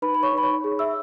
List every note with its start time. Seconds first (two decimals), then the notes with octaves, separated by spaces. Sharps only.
0.02 D#4 B4 B5
0.14 B5
0.23 C#5 C#6
0.33 D#4 B5
0.43 C#5 C#6
0.64 G#4
0.79 E5 E6